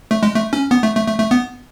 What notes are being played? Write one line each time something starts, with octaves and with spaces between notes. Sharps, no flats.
A3
G#3
A3
C#4
B3
A3
A3
A3
A3
B3